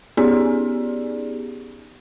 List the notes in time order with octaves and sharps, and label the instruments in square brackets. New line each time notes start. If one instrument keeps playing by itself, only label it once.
[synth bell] B3 C#4 D#4 G4 G#4 D5